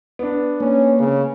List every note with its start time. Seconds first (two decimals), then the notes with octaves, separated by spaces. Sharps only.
0.19 B3 D4
0.60 A#3 C#4
0.99 C#3